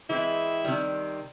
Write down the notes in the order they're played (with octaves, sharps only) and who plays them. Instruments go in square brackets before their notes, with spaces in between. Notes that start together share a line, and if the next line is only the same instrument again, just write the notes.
[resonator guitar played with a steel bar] E3 G#3 C4 [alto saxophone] E4
[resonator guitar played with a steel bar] C3 D#3 G3